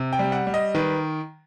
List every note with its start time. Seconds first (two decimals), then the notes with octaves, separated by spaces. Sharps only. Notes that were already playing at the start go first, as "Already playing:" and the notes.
Already playing: C3
0.13 G5
0.19 G3
0.32 F#5
0.47 G3
0.54 D#5
0.75 D#3 B4